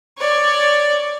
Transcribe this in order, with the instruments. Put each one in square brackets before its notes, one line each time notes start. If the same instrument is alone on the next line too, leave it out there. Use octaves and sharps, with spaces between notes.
[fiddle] C#5 D5